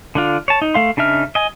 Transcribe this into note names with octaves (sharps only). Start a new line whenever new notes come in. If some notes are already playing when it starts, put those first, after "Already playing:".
D3 D4 F4
C#5 A5
D#4
A3 F5 C6
C#3 D4 D#4 E5 F6
D#5 G#5